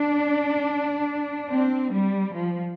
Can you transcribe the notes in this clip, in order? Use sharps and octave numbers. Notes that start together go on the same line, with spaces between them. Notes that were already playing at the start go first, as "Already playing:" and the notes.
Already playing: D4
C4
G3
F3